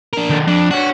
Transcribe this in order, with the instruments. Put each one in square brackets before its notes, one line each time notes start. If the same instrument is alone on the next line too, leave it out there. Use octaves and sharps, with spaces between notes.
[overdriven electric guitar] D4 A#4
[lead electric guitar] D#3 A4
[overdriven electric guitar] F2 [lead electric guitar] D4
[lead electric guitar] D4 C#5 [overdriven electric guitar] F#4